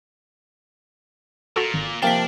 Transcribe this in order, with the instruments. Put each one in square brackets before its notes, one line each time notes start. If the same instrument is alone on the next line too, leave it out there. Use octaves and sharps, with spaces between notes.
[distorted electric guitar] A#2 [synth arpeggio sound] F#4 A4
[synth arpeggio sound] G#1
[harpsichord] C3 F3 A#3 [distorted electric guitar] D4 [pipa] G5 [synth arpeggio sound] B6 E7